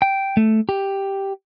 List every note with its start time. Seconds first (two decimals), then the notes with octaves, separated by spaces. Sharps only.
0.02 G5
0.37 A3
0.69 G4